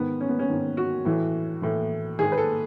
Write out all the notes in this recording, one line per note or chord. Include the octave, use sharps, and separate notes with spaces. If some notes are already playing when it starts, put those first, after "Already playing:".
Already playing: G#2 D#3 B3
C#4
B3
C#4
G#2 D#3
F#4
A2 E3
A2 E3
G#2 D#3 G#4
B4
A4